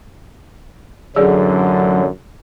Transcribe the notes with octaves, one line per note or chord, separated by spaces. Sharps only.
A1 F#2 D3 F#3 G#4 D5